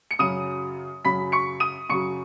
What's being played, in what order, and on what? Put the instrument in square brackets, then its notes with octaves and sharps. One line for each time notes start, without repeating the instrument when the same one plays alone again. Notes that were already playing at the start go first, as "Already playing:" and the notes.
[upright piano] C#7
F#2 C#3 F#3 D#6 D#7
F#2 C#3 F#3 B5 B6
C#6 C#7
D#6 D#7
F#2 C#3 F#3 C#6 C#7